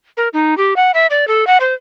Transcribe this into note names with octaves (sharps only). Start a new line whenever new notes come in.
A#4
D#4
G4
F#5
E5
D5
A4
F#5
C5